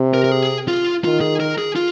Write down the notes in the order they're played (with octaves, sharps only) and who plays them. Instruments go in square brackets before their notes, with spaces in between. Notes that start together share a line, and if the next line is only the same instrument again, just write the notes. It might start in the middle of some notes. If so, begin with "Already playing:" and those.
Already playing: [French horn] C3
[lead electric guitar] A#4
A#4
G#4
F4
[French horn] D#3 [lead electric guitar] F4
[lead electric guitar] G#4
A#4
G#4
F4